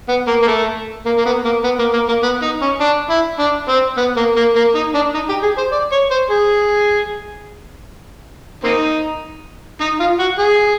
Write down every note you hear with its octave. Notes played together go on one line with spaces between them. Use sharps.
B3
A#3
A#3
A3
A#3
A#3
B3
A#3
B3
A#3
A#3
A#3
B3
D#4
C#4
D4
E4
D4
C4
B3
A#3
A#3
A#3
D#4
D4
D#4
G4
G#4
C5
D5
C#5
C5
G#4
A#3 C4 D#4
D#4
F4
F#4
G#4